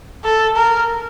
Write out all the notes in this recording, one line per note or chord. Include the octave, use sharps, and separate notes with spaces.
A4
A#4